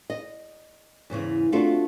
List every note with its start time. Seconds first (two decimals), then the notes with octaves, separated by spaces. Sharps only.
0.10 D#5
1.10 E2 G#2 C#3 E3
1.52 A3 C4 D4 F4 F#4 A4